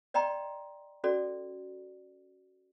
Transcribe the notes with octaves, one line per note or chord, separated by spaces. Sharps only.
D5 D#5 G5 A#5 C6
C#4 F#4 A4 D5